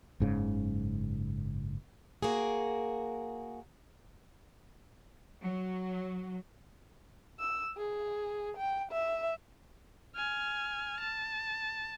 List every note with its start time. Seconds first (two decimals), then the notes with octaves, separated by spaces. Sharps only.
0.20 F#1 G#2 C#3
2.23 A#3 F#4 G#4
5.42 F#3
7.40 E6
7.77 G#4
8.57 G5
8.92 E5
10.15 G#5 F6
11.00 A5